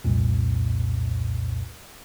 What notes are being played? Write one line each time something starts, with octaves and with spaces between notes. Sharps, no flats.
C2 F2 A#2